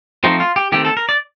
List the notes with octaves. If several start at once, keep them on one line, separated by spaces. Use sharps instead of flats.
F3 A3 C4 D#4
F4
G4
D#3 A3 C4 G4
A4
A#4
D5